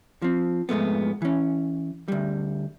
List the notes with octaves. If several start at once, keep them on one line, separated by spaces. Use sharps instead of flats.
F3 C4
F2 G#2 G#3 A3 B3
E3 C#4
D2 G3